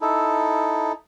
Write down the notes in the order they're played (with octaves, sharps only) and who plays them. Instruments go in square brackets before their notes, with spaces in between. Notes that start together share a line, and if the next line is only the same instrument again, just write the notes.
[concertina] D#4 E4 A4